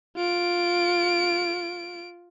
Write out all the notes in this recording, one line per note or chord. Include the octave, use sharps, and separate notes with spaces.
F4 D7